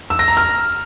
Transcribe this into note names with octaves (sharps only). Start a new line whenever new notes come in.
E6
A#6
A#5
F6